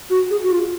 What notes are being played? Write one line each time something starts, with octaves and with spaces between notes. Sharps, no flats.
F#4
G#4
F#4
F4